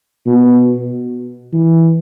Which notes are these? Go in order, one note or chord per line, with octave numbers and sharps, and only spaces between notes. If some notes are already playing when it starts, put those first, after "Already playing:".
B2
E3